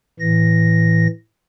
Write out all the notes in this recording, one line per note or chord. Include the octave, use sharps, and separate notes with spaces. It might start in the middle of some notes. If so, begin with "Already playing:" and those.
A2 E3 A#6